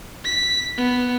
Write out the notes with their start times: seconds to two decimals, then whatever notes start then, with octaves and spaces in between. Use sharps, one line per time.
0.24 B6
0.78 B3